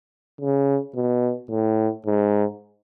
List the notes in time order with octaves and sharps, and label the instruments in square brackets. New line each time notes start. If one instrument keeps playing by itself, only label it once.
[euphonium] C#3
B2
A2
G#2